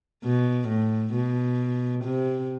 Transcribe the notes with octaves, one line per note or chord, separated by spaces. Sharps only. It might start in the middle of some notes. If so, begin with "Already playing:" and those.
B2
A2
B2
C3